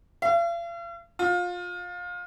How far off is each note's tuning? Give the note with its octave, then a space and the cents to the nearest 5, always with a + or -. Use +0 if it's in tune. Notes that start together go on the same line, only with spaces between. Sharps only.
F5 -45
F4 +25